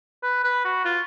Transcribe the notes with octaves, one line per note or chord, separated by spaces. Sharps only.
B4
B4
F#4
F4